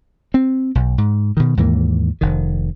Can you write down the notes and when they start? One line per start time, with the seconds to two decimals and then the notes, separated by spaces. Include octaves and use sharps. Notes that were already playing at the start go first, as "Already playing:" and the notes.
0.34 C4
0.75 B1
0.98 G#2
1.37 B2 D#3
1.57 D#2 G#2 E3 A#3
2.21 F1 D#3